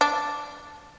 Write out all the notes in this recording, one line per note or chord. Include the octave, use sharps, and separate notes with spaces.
D4